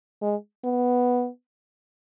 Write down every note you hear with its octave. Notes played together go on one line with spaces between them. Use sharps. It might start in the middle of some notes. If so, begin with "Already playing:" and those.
G#3
B3